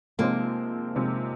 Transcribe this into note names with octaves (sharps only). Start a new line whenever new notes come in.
C3 F3 G#3 A#3 C4 D#4
C3 F3 G#3 C4 D#4